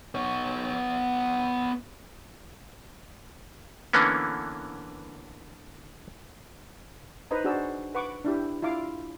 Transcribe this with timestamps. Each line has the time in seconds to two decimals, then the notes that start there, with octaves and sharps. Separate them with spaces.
0.15 B3 C#5
3.93 D3 E3 A#3 B3 C#4
7.31 D#4 B4 C5 D#5 A#5
7.44 D4 F#4 G#4 C5 D5 E6
7.95 B4 F#5 C#6 D6
8.25 D4 E4 G4
8.62 E4 F4 F5 D6